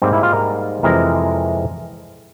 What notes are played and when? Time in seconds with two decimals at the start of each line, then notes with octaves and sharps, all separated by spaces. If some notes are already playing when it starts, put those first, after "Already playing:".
0.02 G#2 G3 A#3 C4
0.13 E4
0.23 F4
0.33 A#4
0.83 F2 C3 E3 G#3 A#4